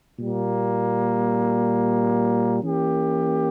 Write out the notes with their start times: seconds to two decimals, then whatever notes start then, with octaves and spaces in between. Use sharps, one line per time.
0.18 A#2 G3 A#3
2.63 E3 A#3 C#4 G4